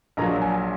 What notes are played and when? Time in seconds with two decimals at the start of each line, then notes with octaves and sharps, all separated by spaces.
0.17 A#1 A#2 F#3 A#5
0.42 G#5